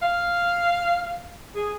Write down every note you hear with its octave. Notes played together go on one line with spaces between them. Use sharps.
F5
G#4